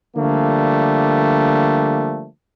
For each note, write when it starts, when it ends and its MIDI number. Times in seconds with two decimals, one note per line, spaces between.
0.17 2.27 50
0.17 2.27 53
0.17 2.27 55
0.17 2.27 57
0.17 2.27 58